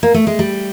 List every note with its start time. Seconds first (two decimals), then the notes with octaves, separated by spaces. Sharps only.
0.03 A#3
0.14 A3
0.27 G#3
0.39 G3